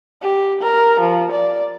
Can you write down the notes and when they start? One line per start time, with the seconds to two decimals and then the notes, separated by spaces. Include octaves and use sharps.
0.22 G4
0.61 A#4
1.00 F3
1.32 D5